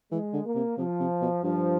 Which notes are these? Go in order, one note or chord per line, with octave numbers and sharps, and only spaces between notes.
E3 G#3
D3
A#3
C3
C3 F3
C3
B2
G2 F3